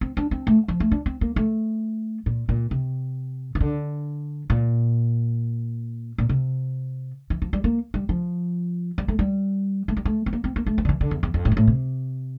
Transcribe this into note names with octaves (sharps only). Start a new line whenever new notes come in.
C4
D4
C4
A3
F3
A3
D4
C4
A#3
A3
A#2
A#2
C3
E3
D3
A#2
A#2
C3
E3
F3
G3
A#3
G3
F3
G3
A3
G3
A3
G3
A3
C4
A#3
C4
A#3
A3
F3
D3
E3
D3
E2
E2
F2
A2
G2
A2
C3